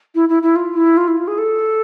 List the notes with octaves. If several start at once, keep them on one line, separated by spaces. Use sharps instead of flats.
E4
E4
E4
F4
E4
F4
E4
F4
G#4
A4